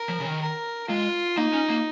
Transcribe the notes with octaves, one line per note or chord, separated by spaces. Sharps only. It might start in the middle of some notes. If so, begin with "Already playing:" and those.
Already playing: A#4
F3
C#3
D#3
A#4
G#3 F4
A#3 D#4
C#4
A#3